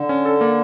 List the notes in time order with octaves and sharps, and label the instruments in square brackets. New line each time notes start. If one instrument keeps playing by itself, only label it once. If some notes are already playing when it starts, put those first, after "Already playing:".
Already playing: [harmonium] D3
[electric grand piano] C#4
A4
A#3